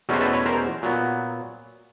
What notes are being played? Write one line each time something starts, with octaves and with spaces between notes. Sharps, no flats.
E2 B2 F#3 A3 C#4 C5
A4 B4
B4 C#5
A#4 C5
A#2 F#3 B3